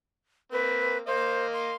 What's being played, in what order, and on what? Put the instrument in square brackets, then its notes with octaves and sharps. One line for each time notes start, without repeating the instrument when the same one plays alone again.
[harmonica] A#3 C4 [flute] B4
[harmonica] A#3 D#5 F5 [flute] C5
[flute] C6